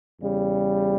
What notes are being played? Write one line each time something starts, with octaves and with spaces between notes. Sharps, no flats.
E2 C#3 G3